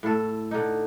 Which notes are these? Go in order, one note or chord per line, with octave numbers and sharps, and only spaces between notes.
A2 A4
D3 D#4